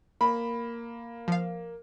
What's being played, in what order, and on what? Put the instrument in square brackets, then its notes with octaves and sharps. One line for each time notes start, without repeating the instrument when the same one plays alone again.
[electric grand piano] A#3 [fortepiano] B5
[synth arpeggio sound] F3 F5